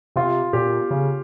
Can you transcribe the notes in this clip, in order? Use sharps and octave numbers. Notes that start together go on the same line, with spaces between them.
C3 F4
A#2 G4
C#3